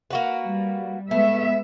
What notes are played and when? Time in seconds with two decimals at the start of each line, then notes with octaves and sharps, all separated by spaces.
0.11 A#3 F#4 B4
0.45 G3
1.11 G#3 A3 B3 E5